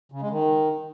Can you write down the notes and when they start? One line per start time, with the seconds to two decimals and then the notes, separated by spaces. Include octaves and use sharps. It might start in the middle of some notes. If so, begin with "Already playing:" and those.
0.12 C#3
0.21 G#3
0.31 D#3